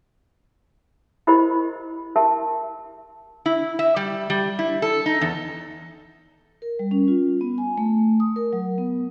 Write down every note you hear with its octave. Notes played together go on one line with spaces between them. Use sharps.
E4 G4 A#4 C5 D#5 B5
G4 A#4 E5 A5
E4
E5
G3
G3
E4
A4
D#4
E2
A#4
G3
C#4
F4
B3
G#5
A3
D#6
A#4
F#3
B3